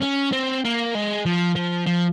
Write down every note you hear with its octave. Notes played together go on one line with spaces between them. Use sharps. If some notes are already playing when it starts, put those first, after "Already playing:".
C#4
C4
A#3
G#3
F3
F3
F3